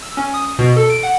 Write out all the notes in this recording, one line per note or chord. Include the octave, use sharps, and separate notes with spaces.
E6
C#4
D#6
B2
A4
D7
F#5